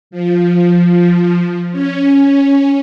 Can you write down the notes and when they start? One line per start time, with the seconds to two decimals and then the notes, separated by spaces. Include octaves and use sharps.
0.11 F3
1.72 C#4